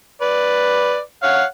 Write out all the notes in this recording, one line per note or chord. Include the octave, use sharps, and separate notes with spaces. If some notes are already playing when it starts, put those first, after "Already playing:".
B4 D5
C#5 F5 F#5